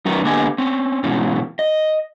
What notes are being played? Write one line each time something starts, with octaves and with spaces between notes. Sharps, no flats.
F#3 C#4 D#4 A#4 B4
D3 A#3 B3 G4 D#5 G#5
C4 C#4
G#2 B2 E3 C#4
D#5